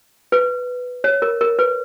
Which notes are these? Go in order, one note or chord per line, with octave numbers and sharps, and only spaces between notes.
B4
C#5
A#4
A#4
B4